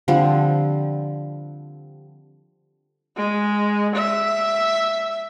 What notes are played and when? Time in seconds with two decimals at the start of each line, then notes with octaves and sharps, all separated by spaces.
0.08 D3 F3 G3 C4
3.17 G#3
3.96 E5